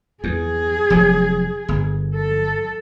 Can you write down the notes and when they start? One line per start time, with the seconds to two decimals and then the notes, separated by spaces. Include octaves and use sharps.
0.24 E2 G#4
0.90 F1 F3 F#3
1.68 G1
2.15 A4